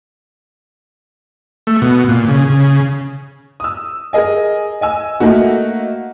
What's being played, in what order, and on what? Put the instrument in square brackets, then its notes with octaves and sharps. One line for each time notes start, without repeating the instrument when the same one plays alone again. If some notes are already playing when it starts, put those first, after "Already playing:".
[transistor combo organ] A3
B2
A#2
C#3
C#3
[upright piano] D#6 E6
G#4 A#4 D#5 G#5
D#5 G#5 E6
A3 A#3 D#4 F#4